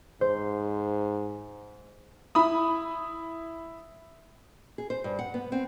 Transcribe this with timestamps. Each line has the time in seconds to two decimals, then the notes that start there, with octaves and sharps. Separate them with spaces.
0.21 G#2 C5
2.35 E4 B5 D#6
4.78 G#4
4.90 C5
5.04 G2
5.19 F#5
5.34 B3
5.52 C4